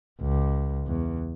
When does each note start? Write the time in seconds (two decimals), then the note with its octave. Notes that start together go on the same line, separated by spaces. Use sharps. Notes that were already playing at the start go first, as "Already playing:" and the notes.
0.21 C#2
0.87 E2